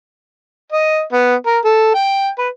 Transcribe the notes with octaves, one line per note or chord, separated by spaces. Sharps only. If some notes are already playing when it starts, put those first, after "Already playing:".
D#5
B3
A#4
A4
G5
B4